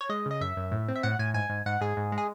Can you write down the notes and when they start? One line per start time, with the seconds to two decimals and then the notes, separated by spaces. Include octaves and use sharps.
0.01 C#5
0.09 G#3 D#5
0.26 C#3 D#5
0.41 F#2 E5
0.57 F#2
0.72 A2
0.88 C4
0.96 E5
1.03 A2 F#5
1.19 A2 G#5
1.34 G#2 G#5
1.50 G#2
1.66 G#2 F#5
1.81 G#2 G#4
1.97 G#2
2.12 G#3
2.18 G#4